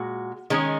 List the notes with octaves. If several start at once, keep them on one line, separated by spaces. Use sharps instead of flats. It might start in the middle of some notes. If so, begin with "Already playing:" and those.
Already playing: A#2 G#3 F#4
D#3 G#3 C#4